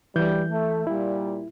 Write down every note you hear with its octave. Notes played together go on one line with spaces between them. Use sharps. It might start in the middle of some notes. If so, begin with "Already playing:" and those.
D2 G2 E3 G3 G6
A3
A#2 G3 E4